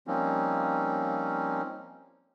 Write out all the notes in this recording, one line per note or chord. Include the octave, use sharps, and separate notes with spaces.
F3 G3 A#3 C4 C#4 D#4